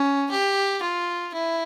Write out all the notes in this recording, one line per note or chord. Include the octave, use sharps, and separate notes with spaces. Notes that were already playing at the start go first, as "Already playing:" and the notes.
Already playing: C#4
G4
F4
E4